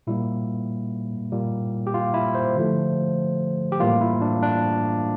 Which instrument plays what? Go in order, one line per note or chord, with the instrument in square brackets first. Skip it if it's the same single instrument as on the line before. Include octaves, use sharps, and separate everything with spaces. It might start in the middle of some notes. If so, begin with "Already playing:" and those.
[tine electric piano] A#2 G3 A#3 E4
A#2 G3 A#3
G4
F4
E4
C5
D3 F3 A3
G4
A2 E3 G3 A#3 F4
E4
D4
D4